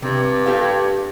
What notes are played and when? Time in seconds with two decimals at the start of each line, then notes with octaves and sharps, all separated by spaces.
0.02 G2 C3
0.46 G4 A4 F5